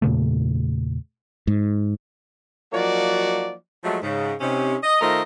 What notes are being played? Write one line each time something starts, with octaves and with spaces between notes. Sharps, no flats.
E2 A#2 C#3 A3
G#2
F3 F#3 A#3 D#4 F#4 D5
F3 F#3 G#3 A3
G#2 C#3
C3 C#4 D#4
D#5
D#3 A3 F4 A#4 C5 D#5